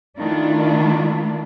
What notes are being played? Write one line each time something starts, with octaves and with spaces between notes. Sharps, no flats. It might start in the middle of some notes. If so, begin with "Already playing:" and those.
D#3 A3 D4 E4 F4